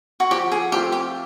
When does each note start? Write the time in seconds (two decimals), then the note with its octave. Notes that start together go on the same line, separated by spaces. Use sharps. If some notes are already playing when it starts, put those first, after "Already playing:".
0.20 F#4
0.31 F3 G4
0.52 G#4
0.72 A3 C4 F4 G4
0.92 G4